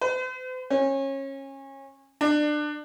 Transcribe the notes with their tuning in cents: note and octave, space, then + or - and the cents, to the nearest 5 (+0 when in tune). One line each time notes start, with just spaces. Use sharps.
C5 -45
C#4 -25
D4 +25